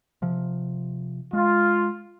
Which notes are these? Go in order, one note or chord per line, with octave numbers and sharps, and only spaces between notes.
C3 F3
G#3 F4